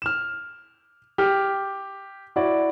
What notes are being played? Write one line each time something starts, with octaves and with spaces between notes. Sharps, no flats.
F6 E7
G4 F6
E4 F#4 D5